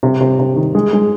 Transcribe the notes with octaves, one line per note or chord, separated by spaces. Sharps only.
C3
C3
C3
D#3
G#3
G#3